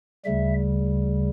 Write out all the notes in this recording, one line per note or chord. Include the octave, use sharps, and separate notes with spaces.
D2 C#3 G3 E5